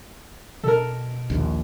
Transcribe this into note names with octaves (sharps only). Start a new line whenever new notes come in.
B2 A4 A#4
A#1 D#2